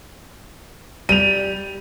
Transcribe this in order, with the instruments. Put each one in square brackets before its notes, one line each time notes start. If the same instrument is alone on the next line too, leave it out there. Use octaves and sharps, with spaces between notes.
[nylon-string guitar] G3 [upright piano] D#7 F7